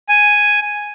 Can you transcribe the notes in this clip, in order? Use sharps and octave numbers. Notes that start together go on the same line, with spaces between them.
G#5